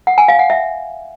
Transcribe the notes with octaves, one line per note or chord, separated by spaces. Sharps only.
F#5
G#5
F5
F#5
E5